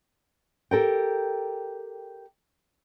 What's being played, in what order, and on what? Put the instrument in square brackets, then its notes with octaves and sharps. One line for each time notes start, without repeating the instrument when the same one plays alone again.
[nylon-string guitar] G4 A4 A#4 G5